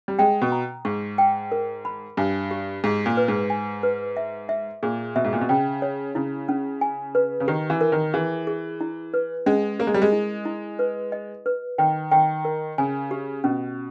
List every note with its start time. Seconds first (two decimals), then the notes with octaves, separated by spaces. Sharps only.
0.08 G3
0.19 G#3 G5
0.41 B2
0.52 A#5
0.85 G#2 C#6
1.18 G5
1.52 A#4
1.85 B5
2.17 G2 G#5
2.51 G4
2.84 G#2 G4
3.06 A#2
3.17 B4
3.28 G#2
3.50 G#5
3.83 B4
4.17 E5
4.49 E5
4.83 A#2 G#4
5.16 B2 E5
5.25 G#2
5.33 A#2
5.41 B2
5.49 C#3 G5
5.82 C#5
6.15 C#3 E4
6.49 C#4
6.81 G#5
7.15 B4
7.40 C#3
7.48 D#3 G4
7.70 E3
7.81 A#4
7.92 D#3
8.14 E3 G#4
8.47 G#4
8.81 E4
9.14 B4
9.46 G#3 C#4
9.79 A#3 A#4
9.87 G#3
9.94 G3
10.02 G#3
10.12 E4
10.45 E4
10.79 B4
11.12 D#5
11.46 B4
11.78 D#3 G5
12.11 D#3 G5
12.45 A#4
12.78 C#3 G#5
13.11 G4
13.44 B2 C#4